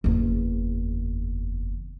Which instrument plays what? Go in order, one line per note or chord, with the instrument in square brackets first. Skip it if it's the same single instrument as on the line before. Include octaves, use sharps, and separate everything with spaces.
[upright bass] F#1 E2